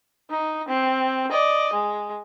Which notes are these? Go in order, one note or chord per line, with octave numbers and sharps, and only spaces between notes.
D#4
C4
D5 D#5
G#3